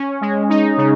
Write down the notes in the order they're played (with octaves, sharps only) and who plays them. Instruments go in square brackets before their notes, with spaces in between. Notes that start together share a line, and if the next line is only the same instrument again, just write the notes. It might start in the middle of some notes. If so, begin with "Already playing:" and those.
Already playing: [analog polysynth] C#4
G#3
D#4
C#3